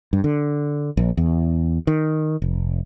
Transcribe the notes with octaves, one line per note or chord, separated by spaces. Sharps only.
G2
D3
A#1
E2
D#3
F1